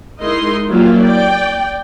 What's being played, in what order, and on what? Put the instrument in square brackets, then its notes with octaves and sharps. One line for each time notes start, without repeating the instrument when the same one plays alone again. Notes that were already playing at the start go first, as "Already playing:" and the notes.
[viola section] G#3 D#4 E4 A#4 D#5 C6
F#3 G3 A#3 E4 F4
D5 G5